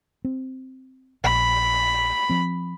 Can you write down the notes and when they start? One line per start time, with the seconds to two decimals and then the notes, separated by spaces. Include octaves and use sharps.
0.24 C4
1.24 A#1 B5
2.30 F3 C4